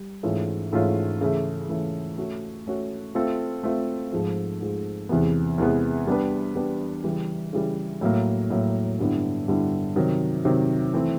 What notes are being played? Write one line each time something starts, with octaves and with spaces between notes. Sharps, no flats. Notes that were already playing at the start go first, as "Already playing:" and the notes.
Already playing: G3
G#2 E3 A3 C#4 F4
G#2 E3 A3 C#4 F4
C#3 E3 A3
C#3 E3 A3
A3 C#4 F#4
A3 C#4 F#4
A3 C4 F4 A4
A3 C4 F4 A4
G#2 F3 G#3
G#2 F3 G#3
E2 C3 E3 G#3 B3
E2 C3 E3 G#3 B3
G3 B3 D4 G4 B4
G3 B3 D4 G4 B4
C#3 E3 G3
C#3 E3 G3
A2 F#3 A#3
A2 F#3 A#3
G2 D3 G3 B3 E4
G2 D3 G3 B3 E4
C3 D#3 F#3
C3 D#3 F#3
E3 A3 C4 E4